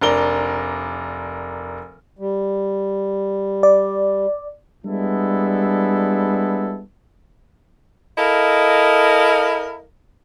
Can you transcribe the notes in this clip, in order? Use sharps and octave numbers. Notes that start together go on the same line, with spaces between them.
F1 D4 A#4 G7
G3
D5
G3 G#3 B3 D4 E4 A4
E4 A4 A#4 D#5 F5